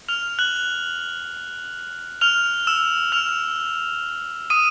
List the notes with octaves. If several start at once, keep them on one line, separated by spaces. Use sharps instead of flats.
F6 F7
F#6 F#7
F6 F7
E6 E7
F6 F7
D#6 D#7